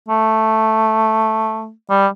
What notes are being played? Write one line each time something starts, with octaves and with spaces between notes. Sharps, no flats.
A3
G3